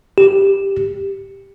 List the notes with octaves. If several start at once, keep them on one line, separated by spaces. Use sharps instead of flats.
G4